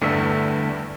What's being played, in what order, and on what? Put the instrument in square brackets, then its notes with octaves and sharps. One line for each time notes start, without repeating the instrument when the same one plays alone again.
[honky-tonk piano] E2 G2 D4 [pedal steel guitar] D3 A3 E5